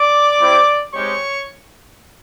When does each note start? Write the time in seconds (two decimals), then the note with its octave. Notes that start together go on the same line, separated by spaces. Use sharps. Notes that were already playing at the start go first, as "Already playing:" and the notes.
Already playing: D5 D6
0.39 G3 C4 E4 G4
0.94 G#3 C4 D#4 G4 C#5 C#6